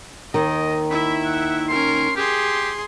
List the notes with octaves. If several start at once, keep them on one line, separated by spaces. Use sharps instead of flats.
D#2 D#3 D#5
E4 E5 B5
F#5
C#4 A#4 C6
G4 G#4 C6